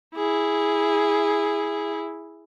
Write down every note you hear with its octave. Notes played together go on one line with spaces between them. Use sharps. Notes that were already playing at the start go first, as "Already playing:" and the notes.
E4 G#4